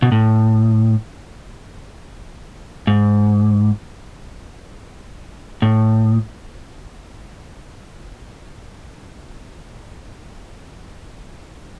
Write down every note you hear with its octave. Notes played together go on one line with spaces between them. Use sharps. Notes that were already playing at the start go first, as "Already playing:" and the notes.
B2
A2
G#2
A2